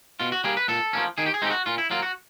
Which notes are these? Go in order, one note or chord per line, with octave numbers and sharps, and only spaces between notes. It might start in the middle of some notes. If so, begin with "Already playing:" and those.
B2 F4
F#4
G3 A#3 G#4
B4
A#2 A4
F3 A#3 C#4
D#3 G#4
G4
G#4
G#3 C4 D#4 G4
F#4
A#2 F4
E4
F#3 A#3 F4
F#4